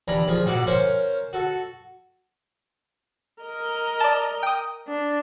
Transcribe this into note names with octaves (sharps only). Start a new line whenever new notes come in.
D#2 E3 D4 A#5 B5
D#3 F3 G#3 F4
A#1 G#2 F#4 D5 F5 F#5
C#4 A#4 C5 F5 C#6
F#4 A4
A#4 D#5
D5 A5
G5 D#6
D4